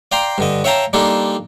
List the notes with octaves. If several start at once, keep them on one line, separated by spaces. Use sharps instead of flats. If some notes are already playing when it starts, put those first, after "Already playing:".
D5 F5 G5 A#5 C6
G2 D3 D#5
C#5 E5 F5 G5 A5 A#5
G3 A#3 D4 D#4 F4 A4